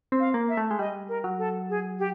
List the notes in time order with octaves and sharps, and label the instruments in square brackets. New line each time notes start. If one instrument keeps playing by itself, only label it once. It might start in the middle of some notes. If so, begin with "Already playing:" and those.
[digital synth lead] C4
[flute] F5
[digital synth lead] A#3
[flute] E5
[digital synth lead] A3
G#3
[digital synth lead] G3 [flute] D#5
[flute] A#4
[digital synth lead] F#3
[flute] A4
G#4
G4